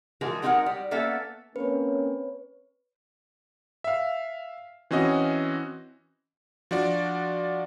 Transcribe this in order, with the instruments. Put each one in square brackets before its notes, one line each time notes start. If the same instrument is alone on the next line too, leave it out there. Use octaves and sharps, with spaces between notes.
[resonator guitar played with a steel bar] E3 F3 G#3 F#4 G#4 A#4
G#3 C4 D#4 G4 A#4 F#5
G3
A#3 B3 C#4 A4 E5
[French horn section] A#3 C4 C#4 [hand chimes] B4 C#5
[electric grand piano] E5 F5
E3 C4 C#4 F#4 D#5
F3 D4 F#4 D5